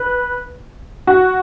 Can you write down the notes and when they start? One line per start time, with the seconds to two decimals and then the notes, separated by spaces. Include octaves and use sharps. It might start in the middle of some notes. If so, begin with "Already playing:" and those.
Already playing: B4
1.07 F#4